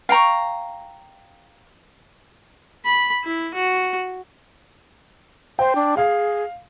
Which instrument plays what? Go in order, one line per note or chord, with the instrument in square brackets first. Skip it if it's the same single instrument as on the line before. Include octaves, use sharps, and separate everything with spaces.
[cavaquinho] F5 G5 A#5 C#6
[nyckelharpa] B5
E4
F#4
[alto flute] C5 [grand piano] G5
[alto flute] D4
[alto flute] G#4 [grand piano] F5